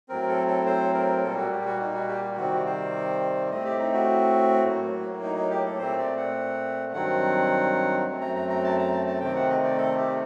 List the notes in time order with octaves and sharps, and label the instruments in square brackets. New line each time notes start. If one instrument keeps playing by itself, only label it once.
[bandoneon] A2 F#3 C4 A#4
A4
A4
C5
A#4
A#2 G3 A#3 A4
F#4
G4
F#4
D#4
F#4
G4
C3 D#3 G3 C4 F#4
C5
A2 A3 C4 D#5
G4
D#4
F#4
A2 F#3 A#3
D#4
D#4
G4
A4
A#2 A3 C4 C5
D5
F#5
G2 D#3 F#3 C4 F#5
F#2 F#3 A3 C4
A#5
A#5
A#5
A5
A#5
A5
A5
C3 D#3 A3 C4 G5
F#5
D#5
D5
A4
G4